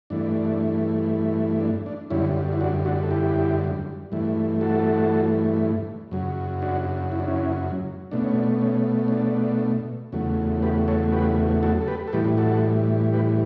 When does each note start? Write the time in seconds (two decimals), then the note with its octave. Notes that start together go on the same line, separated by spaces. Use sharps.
0.10 G2 E3 A3 D4
1.60 D4
1.86 D4
2.10 F#2 D3 G3 C#4 E4
2.53 E4
2.61 D4 F#4
2.85 D4 F#4
3.03 A4
3.11 E4 G4
4.12 G2 E3 A3
4.61 F#4 A4
6.11 F#2 C#3 F#3
6.62 D4 F#4
7.12 E4
7.20 D4
7.28 C#4 E4
8.11 B2 A3 D4
8.24 C#4
8.36 D4
8.62 C#4
9.08 C#4
9.12 D4
10.12 E2 C#3 F#3 A3
10.62 G4 B4
10.88 A4 C#5
11.12 G4 B4
11.63 F#4 A4
11.80 A4
11.88 G4 B4
12.08 A4
12.13 A2 E3 G3 G4 B4
12.37 F#4 A4
13.13 G4 B4